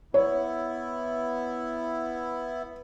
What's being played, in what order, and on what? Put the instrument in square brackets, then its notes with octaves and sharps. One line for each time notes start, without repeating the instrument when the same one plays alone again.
[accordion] B3 E4 [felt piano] C#5